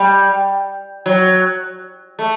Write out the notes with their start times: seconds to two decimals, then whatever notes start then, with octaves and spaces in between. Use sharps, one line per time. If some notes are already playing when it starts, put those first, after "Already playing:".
Already playing: G3
1.06 F#3
2.19 A3